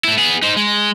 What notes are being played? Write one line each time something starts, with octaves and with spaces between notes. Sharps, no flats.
A3 E4
B3 G#4
D#4 C5
G#3